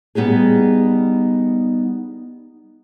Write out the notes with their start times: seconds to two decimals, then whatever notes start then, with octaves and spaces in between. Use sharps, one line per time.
0.15 G3 B3 D#4 G4 G#4